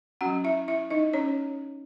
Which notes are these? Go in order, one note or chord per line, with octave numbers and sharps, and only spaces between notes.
F#3 C#4 F#4 F#5
E4 E5
E4 E5
D#4 D#5
C#4 C#5